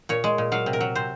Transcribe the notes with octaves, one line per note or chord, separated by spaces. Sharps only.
A#2 C#5
G#3
A#2
F#3 F5
C3
A#4
F#3
C3 C5